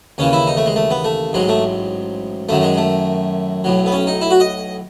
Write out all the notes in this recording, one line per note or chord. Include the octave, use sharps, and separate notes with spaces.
D#2 C#3 E3 C#4
E4
D#4
A3
G#3
A3
B3
A3
A1 G#2 F#3 G#3
A3
F#2 D#3 F#3 A3
G#3
A3
B1 A2 F#3
B3
C#4
D#4
E4
F#4
D#5